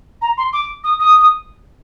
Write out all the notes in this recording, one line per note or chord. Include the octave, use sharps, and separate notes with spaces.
A#5
C6
D6
D#6
D#6